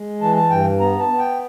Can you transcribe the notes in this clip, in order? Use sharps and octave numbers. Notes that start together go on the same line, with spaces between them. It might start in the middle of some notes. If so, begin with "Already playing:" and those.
Already playing: G#3
E3 A5
A5
G2 G5
B3 A#5
A5
B3
G5